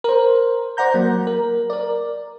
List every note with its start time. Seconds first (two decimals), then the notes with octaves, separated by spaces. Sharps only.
0.04 A#4 C5
0.77 C5 D5 F#5 A#5 G6
0.94 F#3 A#3
1.27 A#4
1.70 A#4 D5